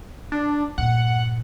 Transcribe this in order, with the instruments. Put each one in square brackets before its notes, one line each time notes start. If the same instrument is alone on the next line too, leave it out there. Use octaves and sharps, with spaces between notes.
[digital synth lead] D4
[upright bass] G2 A#2 [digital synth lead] F#5